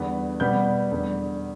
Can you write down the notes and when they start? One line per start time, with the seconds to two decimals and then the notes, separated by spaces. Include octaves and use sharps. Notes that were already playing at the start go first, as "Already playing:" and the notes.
Already playing: E2 D3 G3 B3
0.40 B2 G3 B3 G6
0.91 E2 D3 G3